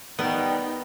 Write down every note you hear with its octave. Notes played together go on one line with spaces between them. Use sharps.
D#3 G3 B3 D#4 F#5 G5